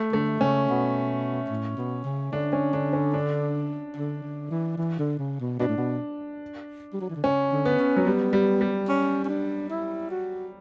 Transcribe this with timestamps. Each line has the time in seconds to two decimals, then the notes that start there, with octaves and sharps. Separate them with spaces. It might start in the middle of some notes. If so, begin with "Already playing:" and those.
Already playing: A3
0.13 D3 A3
0.40 C#3 C#4
0.69 B2
1.50 A2
1.77 B2
2.04 C#3
2.32 D3 D4
2.53 C#4
2.73 D3 D4
2.93 C#4
3.14 D4
3.97 D3
4.23 D3
4.51 E3
4.77 E3
4.99 D3
5.18 C#3
5.40 B2
5.59 B2 D4
5.68 A2
5.77 B2
6.93 G3
7.01 F#3
7.09 E3
7.16 D3
7.24 C#3 C#4
7.52 D3
7.65 B3
7.79 C#4
7.96 F#3
8.05 G3 B3
8.33 G3
8.61 G3
8.88 C#4
9.24 C#4
9.29 D4
9.70 E4
10.11 F#4